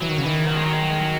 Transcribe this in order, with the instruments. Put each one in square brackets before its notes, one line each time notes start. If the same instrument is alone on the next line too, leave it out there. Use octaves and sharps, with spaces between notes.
[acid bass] E3 [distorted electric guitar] F#3
[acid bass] D#3
C#3
[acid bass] D#3 [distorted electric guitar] E3
[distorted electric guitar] F#3
G#3
F#3
G#3
F#3
G#3
F#3